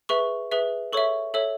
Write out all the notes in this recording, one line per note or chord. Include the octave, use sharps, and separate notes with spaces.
G#4 B4 E5 C#6
G#4 B4 E5
A4 C#5 E5 C#6
A4 C#5 E5